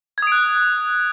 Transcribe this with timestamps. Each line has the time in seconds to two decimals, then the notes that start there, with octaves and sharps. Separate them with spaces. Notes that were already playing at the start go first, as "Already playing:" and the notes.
0.18 G#6
0.22 D#6
0.27 D7
0.32 F#6